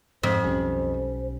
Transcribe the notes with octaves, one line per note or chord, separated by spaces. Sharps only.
F2 G#2 C5
B1 G3 C#4